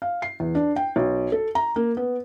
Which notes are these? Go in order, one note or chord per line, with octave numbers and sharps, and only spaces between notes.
F5
C7
E2
D4
G5
B1
A4
A#5
A#3
B3